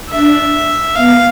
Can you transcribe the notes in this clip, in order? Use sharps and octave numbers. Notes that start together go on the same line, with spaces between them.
D4 E5
B3 F5